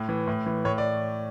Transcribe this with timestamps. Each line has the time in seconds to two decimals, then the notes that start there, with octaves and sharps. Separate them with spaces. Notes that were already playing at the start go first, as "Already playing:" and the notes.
Already playing: A2
0.09 E3
0.27 A2
0.46 E3
0.65 A2 C#5
0.78 D5